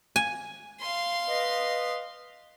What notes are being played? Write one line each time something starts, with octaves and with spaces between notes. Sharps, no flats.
G#5
F5 C6
B4 D#5